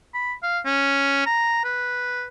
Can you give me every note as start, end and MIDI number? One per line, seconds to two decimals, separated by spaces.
0.14 0.33 83
0.43 0.59 77
0.65 1.25 61
1.26 1.63 82
1.64 2.25 71